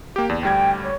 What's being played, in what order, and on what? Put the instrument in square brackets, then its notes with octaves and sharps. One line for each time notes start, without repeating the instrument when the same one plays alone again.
[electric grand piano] A#3 G4 [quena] G5
[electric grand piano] E2 [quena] D5
[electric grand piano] D2 G3 G#6 [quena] G5
[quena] C#5